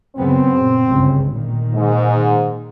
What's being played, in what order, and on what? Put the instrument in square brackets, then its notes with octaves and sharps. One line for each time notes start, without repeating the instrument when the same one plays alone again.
[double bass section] F#2 C#3 B3 [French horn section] C4
[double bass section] A#2
G1 C#2
A#2 D#3
[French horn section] G#2